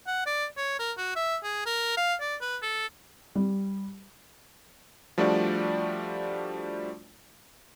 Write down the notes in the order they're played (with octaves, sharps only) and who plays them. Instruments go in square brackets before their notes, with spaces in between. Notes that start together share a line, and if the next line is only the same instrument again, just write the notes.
[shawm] F#5
D5
C#5
A#4
F#4
E5
G#4
A#4
F5
D5
B4
A4
[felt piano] G3
[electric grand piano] F3 G3 A3 D4 F#4 D5